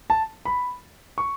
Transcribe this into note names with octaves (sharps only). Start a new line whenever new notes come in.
A5
B5
C#6